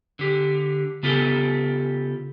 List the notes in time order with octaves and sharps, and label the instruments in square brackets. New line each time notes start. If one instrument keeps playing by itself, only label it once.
[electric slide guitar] D3 G4
C#3 B3 F4 G4 A4